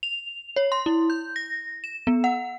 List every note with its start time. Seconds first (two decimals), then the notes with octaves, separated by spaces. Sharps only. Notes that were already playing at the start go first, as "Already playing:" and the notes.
0.03 F7
0.56 C#5
0.72 C6
0.86 E4
1.10 G6
1.36 A#6
1.84 E7
2.07 B3
2.24 F#5